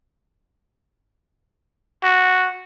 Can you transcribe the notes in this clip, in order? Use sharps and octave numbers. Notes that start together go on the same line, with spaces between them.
F#4